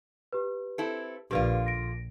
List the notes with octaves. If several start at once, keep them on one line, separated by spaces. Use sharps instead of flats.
G4 B4
C4 E4 A4
A#1 D3 A#3 F4 G4 B4 D5
A#6 D7